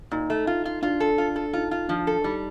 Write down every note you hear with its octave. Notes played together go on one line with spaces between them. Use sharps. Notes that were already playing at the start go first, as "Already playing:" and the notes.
A#2 D#4
A3
F4
F4
D4 F4
A4
F4
A4
D#4 F4
F4
F3 D4
A4
G3 D#4